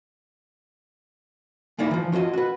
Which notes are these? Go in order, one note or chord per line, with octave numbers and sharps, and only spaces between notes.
G#3 A#3 D#4 E4 D5
E3 F3
C#4 F4 F#4 D#5
F#4 B4